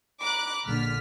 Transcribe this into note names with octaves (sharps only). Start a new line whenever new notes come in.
A#5 B5 D6 F#6
A#1 D3 F6 B6